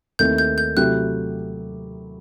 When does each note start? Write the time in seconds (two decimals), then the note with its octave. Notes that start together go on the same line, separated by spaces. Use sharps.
0.19 D#2 D#3 A3 C4 E4 G6
0.38 G6
0.58 G6
0.77 C3 F#3 A3 E4 G4 F#6